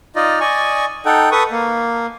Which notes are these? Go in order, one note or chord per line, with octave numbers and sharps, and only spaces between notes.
D#4 F4 D5 D#5
D5 D#5 G#5 C#6
D#4 A4 F#5 G5
A4 B4 C#6 D#6
A#3